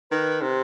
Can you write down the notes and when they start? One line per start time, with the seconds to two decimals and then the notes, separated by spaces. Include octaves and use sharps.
0.11 D#3 B4
0.42 C3